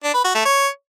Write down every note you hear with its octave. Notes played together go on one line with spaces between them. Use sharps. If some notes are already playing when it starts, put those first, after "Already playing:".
D4
B4
F#4
A3
C#5